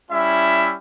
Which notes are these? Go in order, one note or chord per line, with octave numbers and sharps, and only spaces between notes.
G3 C#4 E4 E5